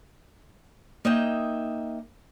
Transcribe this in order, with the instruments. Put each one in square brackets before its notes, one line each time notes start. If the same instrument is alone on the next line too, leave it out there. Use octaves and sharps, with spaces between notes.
[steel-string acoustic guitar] A#3 D#4 D#5 E5 G5